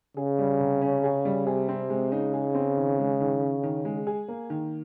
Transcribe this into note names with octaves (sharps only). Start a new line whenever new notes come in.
C#3 G#4
G3
C3
C#4
G#4
G3
C3 G#4
C4
G#3
C#3 D#4
G#4
C4
D#3
G#3
D#3
C#4
D#3
G#3
G#4
A#3
D#3